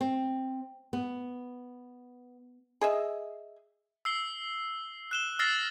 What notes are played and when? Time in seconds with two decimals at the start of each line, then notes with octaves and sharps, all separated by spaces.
0.01 C4
0.93 B3
2.81 G#4 D#5 E5
4.05 E6 C7 G7
5.11 F#6 E7 G7
5.39 E6 F6 A6 A#6 C7 G7